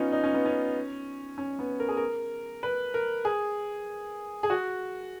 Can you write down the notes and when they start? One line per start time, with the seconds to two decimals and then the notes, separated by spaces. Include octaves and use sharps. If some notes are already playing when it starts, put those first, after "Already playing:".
Already playing: B3 C#4 D#4 F4
0.12 D#4
0.24 C#4
0.34 B3
0.46 C#4
1.38 C#4
1.59 B3
1.80 A#4
1.89 G#4
1.97 A#4
2.63 B4
2.94 A#4
3.25 G#4
4.43 G#4
4.50 F#4